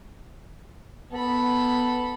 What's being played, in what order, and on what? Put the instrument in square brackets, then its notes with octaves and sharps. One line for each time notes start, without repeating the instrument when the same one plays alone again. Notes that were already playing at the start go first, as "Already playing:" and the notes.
[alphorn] B3 [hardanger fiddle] A4 B5